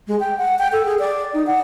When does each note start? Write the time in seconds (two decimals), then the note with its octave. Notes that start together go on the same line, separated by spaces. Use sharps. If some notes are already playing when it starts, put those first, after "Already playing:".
0.08 G#3
0.20 G5
0.38 F#5
0.59 G5
0.72 A4
0.86 G#4
0.99 D5
1.34 D#4
1.47 F#5